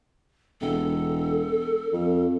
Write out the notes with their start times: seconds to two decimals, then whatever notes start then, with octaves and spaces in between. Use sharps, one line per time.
0.61 E1 A4
1.93 F2